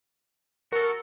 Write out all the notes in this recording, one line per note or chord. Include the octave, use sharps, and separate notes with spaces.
F#4 A4 A#4